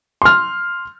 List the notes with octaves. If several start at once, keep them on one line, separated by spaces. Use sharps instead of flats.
C6 F6